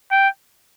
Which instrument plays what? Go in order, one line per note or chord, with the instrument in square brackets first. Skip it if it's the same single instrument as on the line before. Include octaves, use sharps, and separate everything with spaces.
[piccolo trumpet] G5